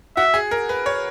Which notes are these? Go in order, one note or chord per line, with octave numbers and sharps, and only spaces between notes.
F#4 E5
G#4
A#4
B4
C#5